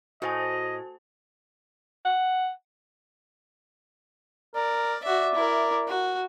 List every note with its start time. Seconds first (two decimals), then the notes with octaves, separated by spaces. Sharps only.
0.22 A2 F#4 C5 D#5 G#5
2.05 F#5
4.56 A#4 D5
5.04 F#4 D5 E5
5.34 E4 A#4
5.87 F#4